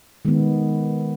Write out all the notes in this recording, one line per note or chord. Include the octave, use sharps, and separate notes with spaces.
D#3 G#3 B3